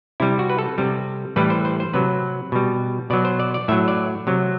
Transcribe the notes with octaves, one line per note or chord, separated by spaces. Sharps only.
C3 G3 E4
F#4
B4
A4
C3 G3
A2 E3 G3 B4
C5
C5
C5
C3 F#3 B4
B2 G3
B2 F#3 D5
C5
D5
D5
A2 F#3 E5
D5
C3 F#3